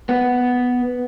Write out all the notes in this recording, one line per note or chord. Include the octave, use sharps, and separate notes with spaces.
B3